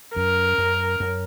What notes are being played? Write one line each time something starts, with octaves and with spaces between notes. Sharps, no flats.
F#2 A#4
F#2
F#2